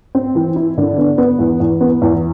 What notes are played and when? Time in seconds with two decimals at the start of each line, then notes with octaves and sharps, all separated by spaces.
0.15 C4
0.35 E3
0.56 E4
0.78 D3
0.98 B3
1.18 B3
1.39 E2
1.60 E2
1.81 B3
2.02 E2